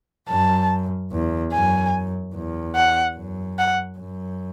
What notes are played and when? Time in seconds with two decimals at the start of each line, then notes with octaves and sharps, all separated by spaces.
0.29 F#2 A5
1.12 E2
1.52 F#2 G#5
2.35 E2
2.75 F#5
3.17 F#2
3.58 F#5
3.98 F#2